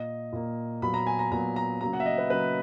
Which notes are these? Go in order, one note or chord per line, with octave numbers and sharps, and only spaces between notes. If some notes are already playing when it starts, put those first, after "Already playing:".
Already playing: A#2 A#3 D#5
A#2 A#3
A#2 F#3 B3 B5
A#5
G#5
A#5
A#2 F#3 B3 A#5
A#5
C#3 F#3 A#3 A#5
F#5
E5
D#5
B4
C#3 F#3 A#3 B4